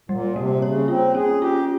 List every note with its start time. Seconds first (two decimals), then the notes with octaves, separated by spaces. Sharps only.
0.09 A#2 G3
0.36 C3 A#3
0.62 C#3 C#5
0.88 C4 F4
1.15 C#4 G#4
1.41 F4 G4